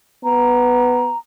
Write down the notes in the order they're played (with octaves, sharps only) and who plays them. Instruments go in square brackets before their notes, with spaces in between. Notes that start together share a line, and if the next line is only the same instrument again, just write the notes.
[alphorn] B3 [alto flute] A#5